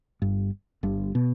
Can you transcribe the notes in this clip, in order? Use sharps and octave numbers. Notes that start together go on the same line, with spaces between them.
G1 G2
G1 G2
B2